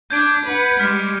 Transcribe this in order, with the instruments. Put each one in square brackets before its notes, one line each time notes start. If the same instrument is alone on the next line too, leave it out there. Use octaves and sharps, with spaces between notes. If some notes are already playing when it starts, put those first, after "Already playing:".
[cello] D4 [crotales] G6 G#6 D7
[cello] B4 F#5
[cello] G3 G#3 [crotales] F6 B6